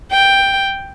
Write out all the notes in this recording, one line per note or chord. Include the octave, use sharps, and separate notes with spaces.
G5